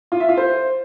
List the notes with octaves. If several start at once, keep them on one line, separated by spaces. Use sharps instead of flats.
F4
E5
F4
C5